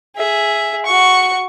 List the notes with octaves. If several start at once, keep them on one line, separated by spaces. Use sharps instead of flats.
G#4 E5
F#4 C#6